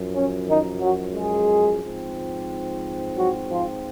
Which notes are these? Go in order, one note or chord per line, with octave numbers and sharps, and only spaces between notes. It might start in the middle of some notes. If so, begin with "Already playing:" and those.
Already playing: F#2 F3
C#4
D#3 D#4
F#3 F#4
G#3 G#4
G#2 F3 C4
F#3 F#4
F3 F4